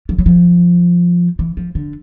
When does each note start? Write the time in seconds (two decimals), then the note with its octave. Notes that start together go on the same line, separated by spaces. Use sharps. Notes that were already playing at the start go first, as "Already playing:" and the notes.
0.09 F3
0.18 F#3
0.26 F3
1.39 E3
1.57 F3
1.75 D3